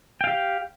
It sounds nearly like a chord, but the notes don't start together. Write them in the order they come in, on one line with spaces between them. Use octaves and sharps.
G5 F5 G4